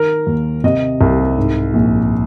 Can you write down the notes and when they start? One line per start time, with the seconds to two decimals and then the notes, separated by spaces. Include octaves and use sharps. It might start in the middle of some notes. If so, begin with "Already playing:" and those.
Already playing: D#3 A#4
0.27 D#2
0.64 C3 D#5
1.01 C2
1.37 G#2
1.74 A#1